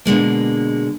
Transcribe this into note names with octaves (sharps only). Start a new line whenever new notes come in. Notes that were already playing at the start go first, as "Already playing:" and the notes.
B2 D3 G#3 A#3